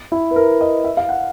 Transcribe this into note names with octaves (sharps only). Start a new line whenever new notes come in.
E4
B4
A#4
D#5
E5
F5
F#5